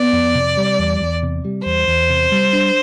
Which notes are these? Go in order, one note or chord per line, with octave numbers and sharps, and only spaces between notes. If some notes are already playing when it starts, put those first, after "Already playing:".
Already playing: B3 D5
F2
C3
G3
E2
E2
C3
G3
E2 C5
E2
C3
G3
D4